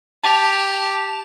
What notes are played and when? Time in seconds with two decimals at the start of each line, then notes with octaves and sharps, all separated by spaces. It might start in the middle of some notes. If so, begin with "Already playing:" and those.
0.23 G4 A5 F7